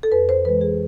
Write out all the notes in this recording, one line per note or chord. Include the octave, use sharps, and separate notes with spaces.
A4
F2 B4
C5
E3 G#3 B4
G#4